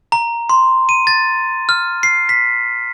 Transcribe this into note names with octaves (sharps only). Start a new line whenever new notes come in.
A#5
C6
D#7
A6
F6
C7
B6